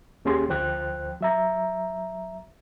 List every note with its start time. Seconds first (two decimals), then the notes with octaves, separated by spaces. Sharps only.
0.25 D#2 A#3 C#4 G4 G#4 C6
0.49 D2 F3 C5 G5 F#6
1.21 F#3 E5 A#5